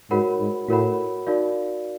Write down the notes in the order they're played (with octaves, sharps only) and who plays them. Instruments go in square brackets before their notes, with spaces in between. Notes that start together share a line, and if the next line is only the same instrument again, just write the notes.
[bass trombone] G#2 [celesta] F#4 A#4 C#5 F#5 B5
[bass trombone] G#2
[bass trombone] A2 [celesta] F#4 A#4 C#5 F#5 B5
[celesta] D#4 F#4 A#4 D5 F5